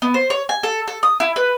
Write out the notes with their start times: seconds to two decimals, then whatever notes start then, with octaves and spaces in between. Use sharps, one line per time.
0.02 B3
0.14 C5
0.30 C#5
0.49 G#5
0.63 A4
0.88 A4
1.03 D#6
1.20 E4
1.36 B4